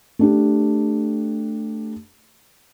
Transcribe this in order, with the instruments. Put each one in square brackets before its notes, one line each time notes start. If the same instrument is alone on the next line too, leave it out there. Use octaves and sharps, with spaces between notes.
[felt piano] A3 D4 G4